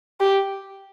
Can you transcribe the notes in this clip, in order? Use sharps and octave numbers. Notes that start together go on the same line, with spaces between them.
G4